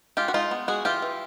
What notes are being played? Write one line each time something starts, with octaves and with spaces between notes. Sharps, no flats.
G#3 F4 G4
F#4
G#3 D#4 F4
B3
G#3 F#4 G#4
E3 F4 G4
E3